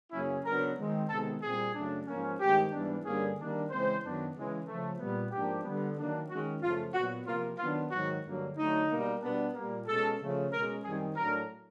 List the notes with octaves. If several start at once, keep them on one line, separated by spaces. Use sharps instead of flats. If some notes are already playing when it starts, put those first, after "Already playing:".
F#2 C#3 F#3 A#3 C#4 E4
C#3 F#3 B3 D4 A#4
D#3 G#3 C4
C3 D#3 G#3 B3 A4
A#2 G3 C4 G#4
F#2 C#3 F#3 A3 D4
G#2 F3 A#3 C#4
G2 D#3 G#3 C4 G4
G#2 E3 G3 B3 D4
G2 D3 G3 A#3 C#4 G#4
D#3 G3 A#3 D4
C#3 E3 G#3 C4 C5
F#2 D#3 F#3 B3 D4
C#3 E3 G#3
C#3 F3 A3
A#2 G3 B3
G#2 F3 A#3 D4 G4
D3 G3 B3
D#3 F#3 A#3 D4
D#3 G#3 C#4 F#4
F#2 C#3 F3 A3 F4
A#2 F#3 B3 F#4
C3 F3 A#3 F4
D#3 F#3 B3 D4 F4
G#2 D#3 F#3 F#4
G2 D3 F#3 A#3
D3 F#3 A3 D#4
B2 G3 A#3
B2 G3 B3 D4
A#2 G3 A#3
B2 G#3 C#4 A4
C#3 F3 A3
B2 G#3 C#4 A#4
F#2 D#3 G3 C4 G#4
A2 F#3 A3 D4 A#4